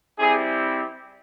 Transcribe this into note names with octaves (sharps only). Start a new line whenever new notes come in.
G3 C4 E4 G4 G#4